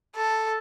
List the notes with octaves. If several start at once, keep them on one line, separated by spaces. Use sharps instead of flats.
A4